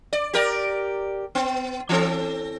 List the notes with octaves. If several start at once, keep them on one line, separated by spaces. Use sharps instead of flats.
D5
G4 A#4 D5
B3
E3 C4 A4